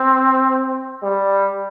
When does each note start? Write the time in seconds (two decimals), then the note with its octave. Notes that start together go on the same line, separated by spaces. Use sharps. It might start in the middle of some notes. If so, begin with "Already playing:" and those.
Already playing: C4
1.03 G3